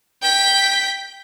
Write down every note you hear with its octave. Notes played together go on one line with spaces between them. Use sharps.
G5 B6